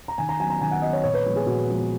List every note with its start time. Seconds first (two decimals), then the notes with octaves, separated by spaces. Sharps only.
0.08 A#5
0.18 D#3 G#5
0.29 A#5
0.39 F#3 B3 G#5
0.50 A#5
0.61 D#3 G#5
0.71 F#5
0.82 F#3 B3 D#5
0.93 C#5
1.04 A#2 C#5
1.14 B4
1.25 F3 G#3 B3
1.36 G#4
1.46 A#2 F#4
1.68 F3 G#3 B3